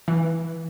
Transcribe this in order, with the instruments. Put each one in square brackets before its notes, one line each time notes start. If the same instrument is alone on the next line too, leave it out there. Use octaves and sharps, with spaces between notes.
[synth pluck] E3